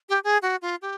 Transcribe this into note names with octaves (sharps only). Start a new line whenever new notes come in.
G4
G#4
F#4
F4
G4